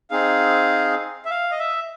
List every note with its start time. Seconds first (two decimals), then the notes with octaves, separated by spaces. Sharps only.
0.11 C4 D#4 G#4 F5
1.25 E5
1.30 F5
1.51 D#5
1.59 E5